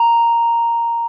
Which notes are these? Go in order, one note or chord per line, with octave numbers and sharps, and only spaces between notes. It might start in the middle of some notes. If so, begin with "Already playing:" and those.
Already playing: A#5